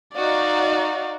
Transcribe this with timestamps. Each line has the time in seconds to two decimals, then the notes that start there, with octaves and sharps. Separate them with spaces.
0.16 D#4 F#4 D5 F5